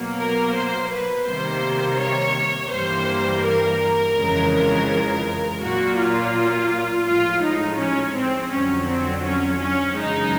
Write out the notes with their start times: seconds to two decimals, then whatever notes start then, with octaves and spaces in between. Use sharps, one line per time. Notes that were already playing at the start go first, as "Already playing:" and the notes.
Already playing: B2 F#3 A#3
0.19 A#4
0.55 C5
0.92 B4
1.28 C3 D#3 G3 A#3 C5
2.01 C#5
2.72 G2 E3 G3 A#3 C5
3.45 A#4
4.17 F2 C#3 E3 G#3
5.62 A#2 F#3 A#3 F#4
5.98 F4
7.07 A2 F3 G#3 F4
7.43 D#4
7.79 C#4
8.15 C4
8.52 F2 D3 F#3 C#4
8.88 C4
9.24 C#4
9.60 C#4
9.96 F#2 C#3 E3 G#3 D#4